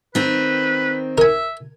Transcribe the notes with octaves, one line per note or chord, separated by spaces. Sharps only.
D#3 C4 B4
A#4 E5 G#5